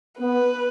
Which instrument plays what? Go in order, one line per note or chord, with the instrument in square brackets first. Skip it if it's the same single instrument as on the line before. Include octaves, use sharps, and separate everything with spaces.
[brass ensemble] B3 [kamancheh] B4